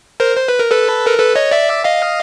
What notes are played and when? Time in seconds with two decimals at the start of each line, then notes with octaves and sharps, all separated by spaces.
0.20 A#4 C5
0.36 C5
0.48 B4
0.59 A#4
0.71 A4 B4
1.07 A#4
1.18 A4 B4
1.36 C#5 D#5
1.51 D5 E5
1.84 D#5 F5